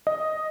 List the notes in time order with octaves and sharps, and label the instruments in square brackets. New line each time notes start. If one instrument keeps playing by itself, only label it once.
[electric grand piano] D#5